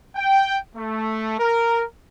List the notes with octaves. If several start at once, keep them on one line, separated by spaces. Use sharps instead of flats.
G5
A3
A#4